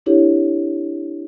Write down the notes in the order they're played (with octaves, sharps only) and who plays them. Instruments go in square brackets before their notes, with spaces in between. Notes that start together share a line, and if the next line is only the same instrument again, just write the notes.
[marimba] C4 D4 E4 G4 A4 C#5